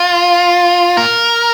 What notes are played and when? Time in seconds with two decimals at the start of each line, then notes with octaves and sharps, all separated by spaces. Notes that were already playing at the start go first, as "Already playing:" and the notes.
Already playing: F4
0.97 A#4